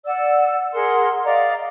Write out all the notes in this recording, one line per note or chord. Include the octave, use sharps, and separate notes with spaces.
D5 F#5 E6
G#4 A#4 F#5 C6
D5 D#5 F5 A#5